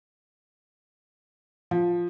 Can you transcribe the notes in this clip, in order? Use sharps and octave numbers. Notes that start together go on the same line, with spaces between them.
F3